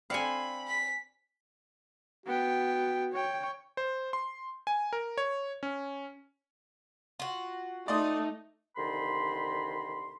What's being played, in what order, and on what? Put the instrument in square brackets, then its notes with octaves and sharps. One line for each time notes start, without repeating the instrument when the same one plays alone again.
[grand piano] C4 D4 C#7 [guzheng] F5 G#5 [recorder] B5
[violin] B6
[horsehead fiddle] B3 G5 [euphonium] F#4
[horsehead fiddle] C#5 G5
[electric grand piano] C5
C6
G#5
A#4
C#5
C#4
[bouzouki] F4 F#4
[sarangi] A3 [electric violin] D#4 D#5 [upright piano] D5 C6 D#6
[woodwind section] C2 D3 D#3 B5 C6